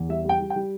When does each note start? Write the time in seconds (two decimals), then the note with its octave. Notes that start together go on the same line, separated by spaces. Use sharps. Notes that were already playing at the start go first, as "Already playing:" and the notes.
Already playing: E2
0.09 G3 E5
0.24 G3 G5
0.41 G3
0.50 G5
0.56 G3